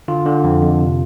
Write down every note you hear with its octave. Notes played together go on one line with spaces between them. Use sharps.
D3 F4
D3
F2
F2
C3